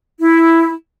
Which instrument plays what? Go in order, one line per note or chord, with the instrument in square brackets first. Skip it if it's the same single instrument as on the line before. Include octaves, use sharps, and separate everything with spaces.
[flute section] E4